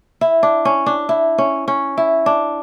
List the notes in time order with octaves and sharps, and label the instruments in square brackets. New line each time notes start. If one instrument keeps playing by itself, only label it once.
[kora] E4
D4
C#4
D4
E4
C#4
C#4
E4
D4